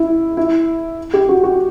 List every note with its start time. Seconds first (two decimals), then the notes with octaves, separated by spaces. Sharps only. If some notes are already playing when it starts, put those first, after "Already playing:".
Already playing: E4
0.37 E4
1.13 G4
1.29 F#4
1.44 F#4